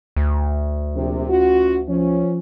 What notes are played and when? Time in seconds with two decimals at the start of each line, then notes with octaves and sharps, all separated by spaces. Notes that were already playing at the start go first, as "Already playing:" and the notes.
0.17 D2
0.95 A#1 C3
1.29 C#4 F4 F#4
1.88 F3 C#4